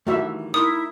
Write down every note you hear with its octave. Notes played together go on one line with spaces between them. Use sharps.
G2 D#3 E3 A3 F#4 E5
D#4 E4 A#4 C6 D#6